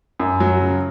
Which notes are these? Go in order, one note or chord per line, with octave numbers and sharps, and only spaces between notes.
F#2
F#3
C#3